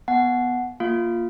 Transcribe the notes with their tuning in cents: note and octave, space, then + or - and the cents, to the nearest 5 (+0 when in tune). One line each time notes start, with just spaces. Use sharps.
B3 +0 F#5 +0 A5 -45
A#3 +0 F4 +0 F5 +0